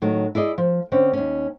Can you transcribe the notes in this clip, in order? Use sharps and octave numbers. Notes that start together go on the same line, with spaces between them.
A2 D#3 F#3
E4 G#4 D5 D#5
F3
D3 C4 C#4
D#2 C#4